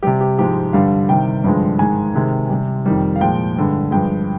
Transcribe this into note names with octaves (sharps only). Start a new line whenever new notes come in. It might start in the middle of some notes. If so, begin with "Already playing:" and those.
C3 G3 G4
G4
G#2 F3 G#3 G4
G2 D3 G3 F5
C3 D#3 G3 G5
G2 D3 F3 G#3
G#2 D#3 G#3 G#5
C3 D#3 G#3
C3 G3
F2 D#3 G3
F5
A#2 F3 G#3 G5
G2 D3 G#3
G2 F3 G#3 G5